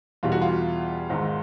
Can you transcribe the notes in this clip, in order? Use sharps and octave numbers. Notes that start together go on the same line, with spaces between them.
E2 B2 G3 F4
F#4
F4
G#1 G#2 D#3